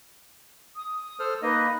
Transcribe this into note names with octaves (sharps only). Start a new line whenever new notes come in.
D#6
A4 C5 F6
A#3 D#4 B4 D#5